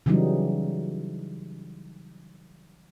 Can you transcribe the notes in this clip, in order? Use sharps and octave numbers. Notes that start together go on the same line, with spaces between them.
C#3 E3 F#3 G3 D#4